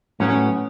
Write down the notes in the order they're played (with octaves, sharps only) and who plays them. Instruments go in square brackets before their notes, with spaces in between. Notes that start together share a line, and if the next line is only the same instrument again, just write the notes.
[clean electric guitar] A2 F#3 B3 [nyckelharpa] C#4